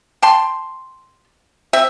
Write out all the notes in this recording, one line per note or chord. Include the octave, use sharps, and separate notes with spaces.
G5 A5 C6
C4 E5